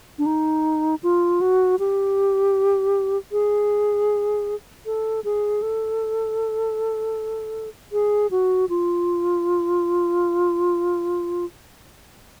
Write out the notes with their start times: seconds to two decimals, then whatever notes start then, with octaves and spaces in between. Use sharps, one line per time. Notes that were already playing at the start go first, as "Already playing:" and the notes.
0.18 D4
0.26 D#4
1.03 F4
1.41 F#4
1.79 G4
3.32 G#4
4.86 A4
5.24 G#4
5.62 A4
7.92 G#4
8.31 F#4
8.69 F4